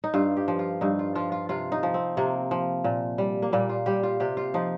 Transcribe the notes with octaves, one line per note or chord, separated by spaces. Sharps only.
D#4
G2 F4
G4
F3
F4
G2 D#4
F4
F3 F4
F4
C3 F4
D#4
F3
C4
C3 A#3
F3
A#2
G3
A#3
A#2 G3
F4
G3 G4
F4
C3 G4
F4
F3 D#4